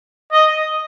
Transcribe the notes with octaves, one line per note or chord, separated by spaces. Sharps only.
D#5